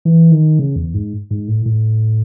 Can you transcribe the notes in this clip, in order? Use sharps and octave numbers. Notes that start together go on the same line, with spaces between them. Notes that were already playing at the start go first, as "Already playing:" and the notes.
E3
D#3
C#3
E2
G#2
G#2
A2
A2